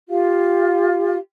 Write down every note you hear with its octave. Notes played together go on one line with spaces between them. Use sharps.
F4 G4 F5